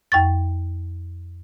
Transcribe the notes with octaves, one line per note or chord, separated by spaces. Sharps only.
F2 G5 C#6 A6